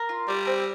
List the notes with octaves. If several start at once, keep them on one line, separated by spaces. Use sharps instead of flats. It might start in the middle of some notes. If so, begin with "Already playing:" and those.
Already playing: A#4
F4
G3 D5
C4